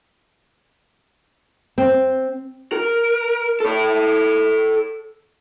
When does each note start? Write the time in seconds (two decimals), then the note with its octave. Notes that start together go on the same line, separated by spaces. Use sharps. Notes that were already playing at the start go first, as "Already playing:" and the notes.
1.78 C4
2.72 A#4
3.60 A4 C#5